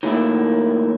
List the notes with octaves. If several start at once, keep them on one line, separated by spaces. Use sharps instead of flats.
D#3 F#3 A3 A#3 E4